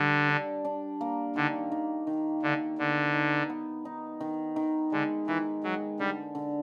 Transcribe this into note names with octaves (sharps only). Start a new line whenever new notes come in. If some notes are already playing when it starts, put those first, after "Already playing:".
Already playing: D3 G3
D4
D4
A#3
D3 D#3
D#3
D#3
D3 F#4
D3 B3
D#4
B3
D#4
D#3
D#3
D3 G#3
D#3 E3
F#3 G#3
D3 G3
D3